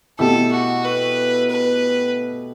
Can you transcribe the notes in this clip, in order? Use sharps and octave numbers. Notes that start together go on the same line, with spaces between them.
B2 A3 E4 G4 A4
F#4
B4
B4